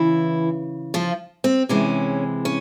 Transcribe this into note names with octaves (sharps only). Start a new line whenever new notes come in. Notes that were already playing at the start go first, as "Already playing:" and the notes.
Already playing: C#3 E3 E4
F3 F4
C4
C3 E3 G#3 C#4
C#4